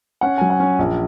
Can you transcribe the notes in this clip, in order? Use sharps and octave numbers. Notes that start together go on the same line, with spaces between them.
C#4 F#5
F#3 G#5
F#5
C#4
A#1